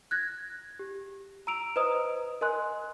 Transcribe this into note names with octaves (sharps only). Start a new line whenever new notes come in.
F#6 G#6 A#6
G4
A#5 E6 D7 F7
B4 C5 D#5 A#5 D#6
A#4 D#5 G#5 C6 F#6